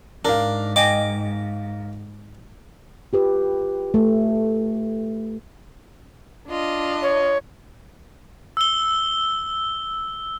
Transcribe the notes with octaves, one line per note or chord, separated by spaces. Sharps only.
G#2 D4 A#4 F5
D#5 G5 G#5 D6
F4 G4 B4
A3
D4 F4 D#5
C#5
E6 G7